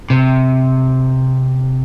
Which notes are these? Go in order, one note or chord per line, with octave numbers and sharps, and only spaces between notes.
C3